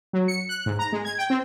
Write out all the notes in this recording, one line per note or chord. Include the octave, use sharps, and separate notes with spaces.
F#3
C#7
F#6
G#2
A#5
G#3
G#6
G5
C4